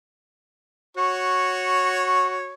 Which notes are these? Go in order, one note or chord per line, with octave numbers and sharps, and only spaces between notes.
F#4 C#5